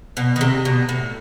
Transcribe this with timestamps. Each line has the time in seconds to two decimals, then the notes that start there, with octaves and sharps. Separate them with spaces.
0.17 B2
0.36 D#3
0.41 C3
0.65 B2
0.89 A2